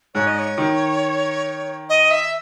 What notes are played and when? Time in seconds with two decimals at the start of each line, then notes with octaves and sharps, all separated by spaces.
0.14 G#2 C#5
0.27 D#5
0.38 C#5
0.58 D#3
1.89 D#5
2.11 E5